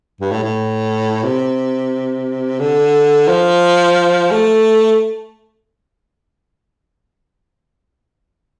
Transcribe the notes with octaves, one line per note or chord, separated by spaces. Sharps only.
G2
A2
A2
C3
D3
F3
A3